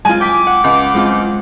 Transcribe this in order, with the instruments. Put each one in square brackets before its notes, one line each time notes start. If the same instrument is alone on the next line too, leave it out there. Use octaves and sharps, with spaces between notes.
[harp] G#3 C4 F4 [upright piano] G#5
[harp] G5 B6 [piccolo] D6
[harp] F#5
[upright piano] C#2
[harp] G#3 C4 F4